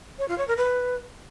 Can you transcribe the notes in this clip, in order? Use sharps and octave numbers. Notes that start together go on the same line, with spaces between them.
C#5
F4
C#5
A#4
B4